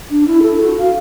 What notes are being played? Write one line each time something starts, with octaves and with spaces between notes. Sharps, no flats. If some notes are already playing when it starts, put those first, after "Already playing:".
D4
E4
A4
F#4
F5